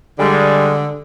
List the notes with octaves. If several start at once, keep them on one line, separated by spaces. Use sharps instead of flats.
D3 G3 G#3